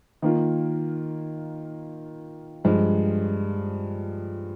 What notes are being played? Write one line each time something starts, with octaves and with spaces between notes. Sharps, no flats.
D#3 A#3 F4
G2 F3 G#3